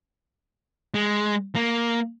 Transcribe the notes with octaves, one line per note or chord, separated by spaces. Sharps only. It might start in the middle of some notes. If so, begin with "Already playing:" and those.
G#3
A#3